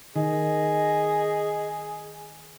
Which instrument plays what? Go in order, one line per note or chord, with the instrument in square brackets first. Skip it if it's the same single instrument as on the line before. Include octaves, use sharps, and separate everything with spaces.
[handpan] D#3 [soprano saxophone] G#4 [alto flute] D#5